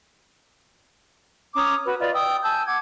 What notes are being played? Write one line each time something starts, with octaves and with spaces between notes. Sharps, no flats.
C#4 A#5 D6 D#6
F#4 B4
F4 B4 D5 D#5
G5 D#6 E6
G#5 A5 E6 G6
F#5 D6 G#6